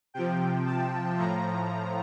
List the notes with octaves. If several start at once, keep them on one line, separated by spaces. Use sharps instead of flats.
C3 F3 G5
A5
A2 F3 A#5